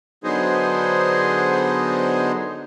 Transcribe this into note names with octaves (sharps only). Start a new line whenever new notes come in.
D3 F#3 B3 D#4 G#4 C5